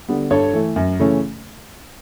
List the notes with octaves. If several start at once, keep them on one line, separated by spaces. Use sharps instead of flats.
D3 G3 B3
G2 A4 C#5
E3 A3
F#2
C#3 E3 A3 C#4